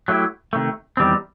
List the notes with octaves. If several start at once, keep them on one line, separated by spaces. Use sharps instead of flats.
F#3 A3 E4 G4
C3 D#3 A3
E2 D#3 G3 C4